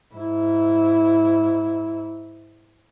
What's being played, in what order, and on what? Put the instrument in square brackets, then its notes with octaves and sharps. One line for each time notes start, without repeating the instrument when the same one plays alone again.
[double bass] G#2 E4